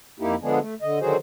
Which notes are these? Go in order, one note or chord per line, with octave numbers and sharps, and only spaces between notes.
F2 A#3 D#4 E4 G4
D3 F3 G#3 B3 D4 G#4
A3
D3 D#5
D3 D#3 F#3 F#4 G#4 C5